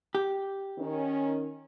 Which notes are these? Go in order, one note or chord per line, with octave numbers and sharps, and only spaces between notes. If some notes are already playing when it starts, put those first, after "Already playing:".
G4
D#3 C#4